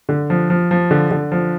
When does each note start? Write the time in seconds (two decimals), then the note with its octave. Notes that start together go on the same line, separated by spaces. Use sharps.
0.09 D3
0.30 F3
0.50 F3
0.71 F3
0.91 D3
1.11 D3
1.32 F3